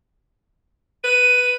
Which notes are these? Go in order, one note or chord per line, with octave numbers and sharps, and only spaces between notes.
B4 D#7